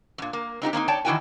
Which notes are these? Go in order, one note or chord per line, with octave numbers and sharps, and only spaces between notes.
F#2 A#2
A#3
C4 D#4 F#4 G4
A#3 C4 C#4 D#4
C#5 D5 G5 A5
D#3 E3 E4 F#4 G5 G#5